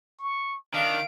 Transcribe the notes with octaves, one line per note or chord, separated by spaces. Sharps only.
C#6
D#3 D4 F5 D7